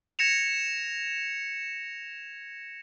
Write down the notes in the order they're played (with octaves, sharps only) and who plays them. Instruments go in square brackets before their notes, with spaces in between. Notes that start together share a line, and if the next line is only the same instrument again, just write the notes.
[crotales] G#6 A#6 C#7 E7 F7